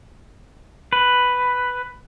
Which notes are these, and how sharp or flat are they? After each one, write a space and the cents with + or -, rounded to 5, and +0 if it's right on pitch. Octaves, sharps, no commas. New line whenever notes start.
B4 +5